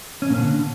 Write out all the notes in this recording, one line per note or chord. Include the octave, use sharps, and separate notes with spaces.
C#4
A#2
D3